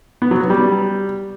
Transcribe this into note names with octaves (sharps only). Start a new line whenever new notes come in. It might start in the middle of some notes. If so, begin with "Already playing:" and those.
B3
F#3
B3
G3